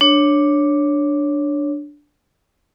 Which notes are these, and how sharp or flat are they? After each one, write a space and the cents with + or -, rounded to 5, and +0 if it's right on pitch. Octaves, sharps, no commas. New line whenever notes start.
D4 +0 C#5 +0